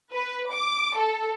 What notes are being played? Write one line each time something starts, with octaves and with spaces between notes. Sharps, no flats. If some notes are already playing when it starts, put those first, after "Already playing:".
B4
D6
A4